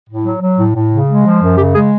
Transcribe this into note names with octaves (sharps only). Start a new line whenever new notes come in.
A2
F#3
F#3
A2
A2
C#3
G#3
F3
F#2
C#3 G4
G#3 G#4